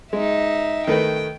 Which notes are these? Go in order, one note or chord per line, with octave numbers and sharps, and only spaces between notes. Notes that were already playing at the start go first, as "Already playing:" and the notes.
G#3 D#4 E5
D#3 A3 B4 G5